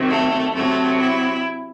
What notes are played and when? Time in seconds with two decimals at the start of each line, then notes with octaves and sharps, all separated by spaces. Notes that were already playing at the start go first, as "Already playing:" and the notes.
Already playing: C3 D#3 F#3
0.09 A3
0.54 C3 F#3 A3
0.99 E4